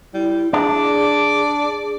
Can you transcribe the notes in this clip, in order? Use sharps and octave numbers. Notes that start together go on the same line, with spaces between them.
G3 E4
D4 G#4 D5